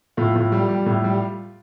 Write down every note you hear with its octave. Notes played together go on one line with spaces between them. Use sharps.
A2 F4
A2
G3
G3
A2
G3